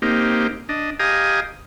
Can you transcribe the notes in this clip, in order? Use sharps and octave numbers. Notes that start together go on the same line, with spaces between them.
A#3 C4 D#4 G4
D4 D#5
G4 D#5 F5 G#5 A#5 D#6